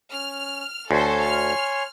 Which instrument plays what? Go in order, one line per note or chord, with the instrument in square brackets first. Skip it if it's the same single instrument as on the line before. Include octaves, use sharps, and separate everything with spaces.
[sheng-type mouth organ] C#4 [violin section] F6
[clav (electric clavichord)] D2 [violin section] A4 C5 [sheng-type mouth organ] C#5 G#5 C6
[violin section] F6